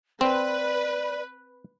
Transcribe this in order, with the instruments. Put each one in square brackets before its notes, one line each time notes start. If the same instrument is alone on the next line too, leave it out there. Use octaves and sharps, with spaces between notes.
[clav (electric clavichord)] C4 [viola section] B4 [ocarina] D5